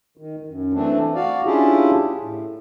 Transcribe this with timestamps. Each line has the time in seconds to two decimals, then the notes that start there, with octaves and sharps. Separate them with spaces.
0.17 D#3
0.47 F#2
0.73 E3 A3 C4 D4
1.15 F#4 D5 F5
1.44 C#4 D4 E4 F4 G4 G#4
2.19 A2